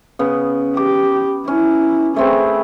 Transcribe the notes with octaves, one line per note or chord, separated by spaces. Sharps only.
C#3 B3
G4 D6
C#4 E4
A3 C4 G#4 B4